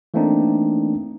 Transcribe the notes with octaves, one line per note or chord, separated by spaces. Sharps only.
E3 A3 A#3 C4 D4 D#4